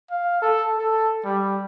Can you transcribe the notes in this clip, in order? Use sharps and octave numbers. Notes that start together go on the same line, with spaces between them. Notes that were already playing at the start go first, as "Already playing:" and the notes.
F5
A4
A4
G3